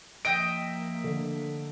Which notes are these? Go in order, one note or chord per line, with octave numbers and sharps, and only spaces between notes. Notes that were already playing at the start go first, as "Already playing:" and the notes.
F3 A#3 D#5 E5 G5 D7
D3